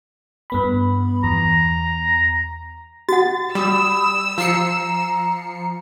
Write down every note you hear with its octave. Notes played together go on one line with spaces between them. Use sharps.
G2 B3 B5
E2 A#5
F#4 F#5 A6
G3 B5 D#6 E6
F3 A#5 C7 C#7